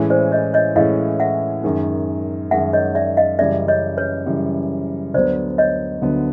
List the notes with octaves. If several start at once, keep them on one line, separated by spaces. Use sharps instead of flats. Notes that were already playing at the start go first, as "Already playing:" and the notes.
Already playing: A2 E3 G#3 C#4
C5 D5
C#5 D#5
C#5 D#5
A2 E3 G#3 C#4 D#5 F5
E5 F#5
F#2 D#3 G#3
F#2 D#3 G#3 E5 F#5
C#5 D#5
D5 E5
D#5 F5
F#2 C#3 E3 G3 D5 E5
C#5 D#5
B4 C#5
F#2 C#3 E3 G3
D2 D3 F#3 B3 C5 D5
C#5 D#5
D2 D3 F#3 B3